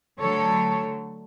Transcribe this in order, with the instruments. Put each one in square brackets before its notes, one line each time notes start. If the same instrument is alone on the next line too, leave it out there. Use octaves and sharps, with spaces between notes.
[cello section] D3 F#3 A3 A4 C#5